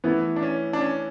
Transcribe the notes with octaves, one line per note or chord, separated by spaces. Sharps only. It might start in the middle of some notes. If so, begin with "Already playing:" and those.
E3 A3 B3 E4
D4
C#4
D4
C#4